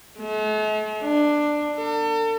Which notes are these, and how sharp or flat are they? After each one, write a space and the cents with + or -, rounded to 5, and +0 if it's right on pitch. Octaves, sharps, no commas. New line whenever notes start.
A3 -45
D4 +10
A4 +40